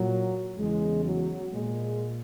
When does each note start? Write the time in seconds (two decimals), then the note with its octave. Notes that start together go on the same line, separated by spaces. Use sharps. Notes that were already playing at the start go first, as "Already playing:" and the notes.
Already playing: A#2 F#3
0.57 E2 C#3 E3 G#3
1.05 F#3
1.53 A#2 G#3